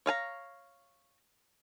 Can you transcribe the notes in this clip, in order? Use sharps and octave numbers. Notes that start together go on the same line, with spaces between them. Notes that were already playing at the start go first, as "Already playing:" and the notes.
C#5 F5 G#5 A#5